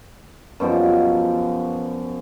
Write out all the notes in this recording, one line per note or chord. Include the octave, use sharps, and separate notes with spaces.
F#2 B2 F3 G3